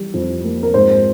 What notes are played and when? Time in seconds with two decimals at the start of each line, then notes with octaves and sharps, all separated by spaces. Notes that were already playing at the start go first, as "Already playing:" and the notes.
Already playing: E3 G3
0.14 F2
0.45 A#3
0.63 A#4
0.74 G#2 C5